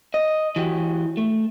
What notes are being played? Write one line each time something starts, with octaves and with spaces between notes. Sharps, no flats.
D#5
E3 F#4 G4
A3